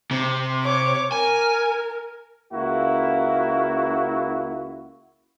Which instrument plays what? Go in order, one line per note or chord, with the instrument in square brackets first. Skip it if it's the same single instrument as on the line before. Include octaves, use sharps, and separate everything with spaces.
[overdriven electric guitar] C3
[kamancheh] C#5 D6
[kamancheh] A#4 [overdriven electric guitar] G#5
[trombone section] C#2 A#3 E4 F#4